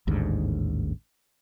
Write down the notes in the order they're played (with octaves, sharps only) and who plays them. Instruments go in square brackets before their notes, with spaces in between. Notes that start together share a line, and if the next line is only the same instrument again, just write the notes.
[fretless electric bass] A1 D#2 G#2 D3